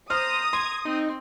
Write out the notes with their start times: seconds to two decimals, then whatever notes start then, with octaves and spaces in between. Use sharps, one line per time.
0.10 C5 A#5 D#6 F6
0.53 C6 G#6
0.85 C4 D#4